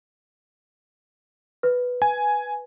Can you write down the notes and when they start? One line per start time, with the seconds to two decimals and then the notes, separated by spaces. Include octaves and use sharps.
1.63 B4
2.02 G#5